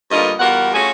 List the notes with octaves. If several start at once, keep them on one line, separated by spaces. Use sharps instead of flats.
G2 D3 A#3 B3 F4 D#5
E2 G3 F4 F#4 A#4 F#5
A3 C#4 F4 F#4 G#4